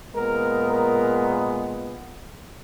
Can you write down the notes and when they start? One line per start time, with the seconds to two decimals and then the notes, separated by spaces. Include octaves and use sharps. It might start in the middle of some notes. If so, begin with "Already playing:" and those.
0.14 A#2 G#3 B3 A#4
0.70 A#4